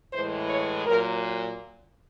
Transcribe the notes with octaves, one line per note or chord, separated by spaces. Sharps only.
A2 E3 G#3 C5
C#5
A#2 F#3 A#4